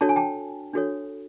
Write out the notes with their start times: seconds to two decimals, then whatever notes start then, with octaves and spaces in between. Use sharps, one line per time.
0.01 D4 F#4 A4 C#5 A5
0.09 G#5
0.16 G5 A5
0.74 D4 F#4 A4 C#5